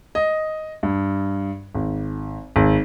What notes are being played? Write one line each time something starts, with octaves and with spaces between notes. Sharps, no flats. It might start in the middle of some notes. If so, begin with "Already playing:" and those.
D#5
G2
G#1
G#1